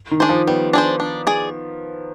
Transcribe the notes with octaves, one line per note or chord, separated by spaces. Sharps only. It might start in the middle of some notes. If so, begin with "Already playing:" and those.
D#3
D4 G#4 C5
F3
G3 B3
D4 G#4 C5
D4
G#4 D5